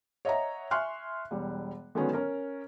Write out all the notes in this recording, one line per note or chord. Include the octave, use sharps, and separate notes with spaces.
C#5 D#5 E5 F#5 A#5
E5 G#5 C6 C#6 F6 F#6
E1 G3
D3 D#3 F#3 G#3 B3 C#4
C#4 A#4